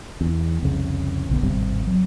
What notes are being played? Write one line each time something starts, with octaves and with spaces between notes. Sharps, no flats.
E2
C2 F2 C#3
B1 D3 B3
D1 G#1 C3 G3
F#3